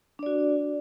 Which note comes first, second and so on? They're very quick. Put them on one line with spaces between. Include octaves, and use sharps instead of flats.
D4 D5 F#4